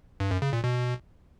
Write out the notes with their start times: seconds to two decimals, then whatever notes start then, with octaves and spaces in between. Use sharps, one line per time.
0.20 G2
0.31 F#2
0.42 C#3
0.53 A#2
0.64 B2